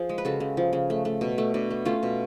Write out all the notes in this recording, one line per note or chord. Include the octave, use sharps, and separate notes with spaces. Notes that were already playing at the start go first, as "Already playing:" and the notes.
Already playing: F3 G#4
G#3
B4
C#3 F#4 A4
C#3
F3
C#3
A3
A3
B2
A3
B2 D4
A3
A3 C#4 F4
B2